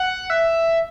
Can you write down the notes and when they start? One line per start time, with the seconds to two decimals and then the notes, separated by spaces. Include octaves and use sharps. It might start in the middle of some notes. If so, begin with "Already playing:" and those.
Already playing: F#5
0.30 E5